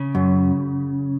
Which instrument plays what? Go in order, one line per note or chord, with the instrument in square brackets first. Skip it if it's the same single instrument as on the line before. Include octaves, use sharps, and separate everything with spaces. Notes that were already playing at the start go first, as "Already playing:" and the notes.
Already playing: [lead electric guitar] C#3
[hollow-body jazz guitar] F#2